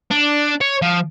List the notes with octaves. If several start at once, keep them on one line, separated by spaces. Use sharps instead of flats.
D4
C#5
F3